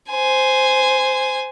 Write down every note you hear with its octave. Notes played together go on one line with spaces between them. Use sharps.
C5 G#5